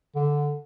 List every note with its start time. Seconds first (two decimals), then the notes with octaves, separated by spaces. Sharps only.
0.15 D3